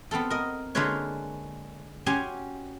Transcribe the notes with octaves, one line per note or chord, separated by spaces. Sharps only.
B3 C4 F4 A4
A#4 D#5
D3 G#3 A#3 F4 B4 C#5
C#4 F#4 G4 G#5 C6